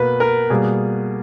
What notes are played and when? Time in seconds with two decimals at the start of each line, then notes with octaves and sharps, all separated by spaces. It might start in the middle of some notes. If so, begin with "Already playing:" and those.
Already playing: B2 A#3 B4
0.20 A#4
0.50 B2 G3 A#3 G#4